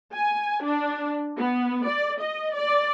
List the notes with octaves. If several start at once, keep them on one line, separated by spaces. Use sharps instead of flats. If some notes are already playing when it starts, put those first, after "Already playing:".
G#5
D4
B3
D5
D#5
D5